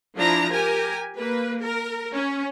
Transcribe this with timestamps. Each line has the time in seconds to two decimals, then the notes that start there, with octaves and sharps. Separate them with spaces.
0.17 F3 D4 E4 A#5
0.52 G4 A#4 G#5
1.18 A#3 B4
1.63 A#4
2.14 C#4